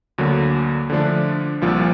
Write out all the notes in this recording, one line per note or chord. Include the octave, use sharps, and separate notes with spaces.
D2 D3 F#3 A#3
D3 F3 A3 D4
C2 A#2 F3